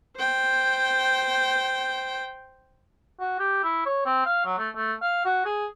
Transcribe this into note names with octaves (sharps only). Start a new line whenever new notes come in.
C5 G5
F#4
G4
E4
C#5
C4
F5
F#3
A3
A3
F5
F#4
G#4